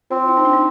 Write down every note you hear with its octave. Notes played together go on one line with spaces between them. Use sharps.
C4 F4
E4
D#4
D4
D#4